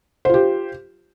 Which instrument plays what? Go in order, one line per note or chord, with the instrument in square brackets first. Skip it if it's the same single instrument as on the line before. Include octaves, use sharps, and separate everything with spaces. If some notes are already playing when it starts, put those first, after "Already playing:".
[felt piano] C5
F4
G4